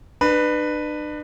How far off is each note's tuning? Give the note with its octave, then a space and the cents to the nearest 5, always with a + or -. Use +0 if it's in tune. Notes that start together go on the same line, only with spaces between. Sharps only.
D4 +40 B4 +0